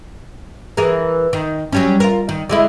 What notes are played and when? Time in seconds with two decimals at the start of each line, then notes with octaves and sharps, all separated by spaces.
0.77 E3 G#4 A#4
1.33 D#3
1.72 F#3 G3 C#4
2.00 F4 A#4
2.29 D#3
2.49 D3 G#3 E4